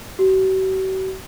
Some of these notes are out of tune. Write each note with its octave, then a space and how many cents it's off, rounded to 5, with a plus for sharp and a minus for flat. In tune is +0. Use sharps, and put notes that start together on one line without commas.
F#4 +45